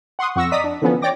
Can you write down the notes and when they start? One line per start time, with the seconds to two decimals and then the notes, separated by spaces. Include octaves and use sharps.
0.19 F#5 C6 C#6 D#6
0.36 F2 F#5 C#6 E6 A#6
0.51 D5 D#5 A#5 D#6 B6
0.64 D4
0.82 D3 E3 F3 B3 C#4
1.02 C#5 D5 G5 D6 A#6